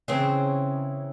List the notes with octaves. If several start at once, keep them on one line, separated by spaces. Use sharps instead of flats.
C#3 E3 C4